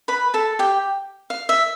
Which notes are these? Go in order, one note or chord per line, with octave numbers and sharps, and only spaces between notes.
B4 B5
A4 A5
G4 G5
F5
E5